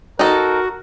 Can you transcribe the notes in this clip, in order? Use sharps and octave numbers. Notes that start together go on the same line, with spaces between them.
D#4 F#4 A4 A#4